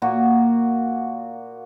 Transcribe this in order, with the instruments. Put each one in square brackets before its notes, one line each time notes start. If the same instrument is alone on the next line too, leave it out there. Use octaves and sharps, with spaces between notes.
[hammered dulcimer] A#2 A#3 F#4